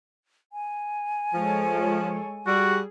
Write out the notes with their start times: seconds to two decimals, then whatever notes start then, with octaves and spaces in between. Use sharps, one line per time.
0.53 G#5
1.34 F3 G#3 A4 C#5
2.47 G3 F#4 G#4